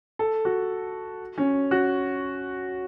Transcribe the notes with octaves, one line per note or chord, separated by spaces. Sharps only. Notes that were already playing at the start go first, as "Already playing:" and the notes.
A4
F#4
C#4
F#4